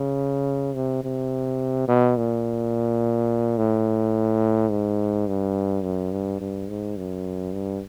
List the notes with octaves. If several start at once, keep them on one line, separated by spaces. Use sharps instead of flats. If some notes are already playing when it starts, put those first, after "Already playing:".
Already playing: C#3
C3
C3
B2
A#2
A2
G#2
G2
F#2
G2
G2
G#2
F#2
G2